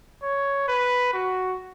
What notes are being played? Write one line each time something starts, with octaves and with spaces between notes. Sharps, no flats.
C#5
B4
F#4